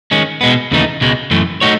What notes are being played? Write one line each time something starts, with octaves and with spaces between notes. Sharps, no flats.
D#3 G#3 C#4
B2 G#3 B3
D#2 C#3 E3 A3 D#4
C#2 B2 G#3
F#2 E3 A3
A3 D#4 F#4 C#5